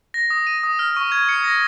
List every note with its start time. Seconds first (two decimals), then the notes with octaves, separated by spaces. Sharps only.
0.14 A#6
0.30 D#6
0.47 D#7
0.63 D#6
0.79 F6
0.96 C#6
1.12 G#6
1.29 C#7
1.44 A#6